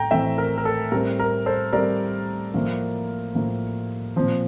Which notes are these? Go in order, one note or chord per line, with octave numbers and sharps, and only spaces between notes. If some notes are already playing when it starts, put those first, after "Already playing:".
Already playing: A2 A3 G5 A#5
A2 E3 A3 C4 E5 G5
A#4
A#4
A4
A2 G3 C4 A#4
A#4
A4 C5
A2 G3 C4 A#4 D5
A2 F3 A#3
A2 F3 A#3
A#2 F3 C4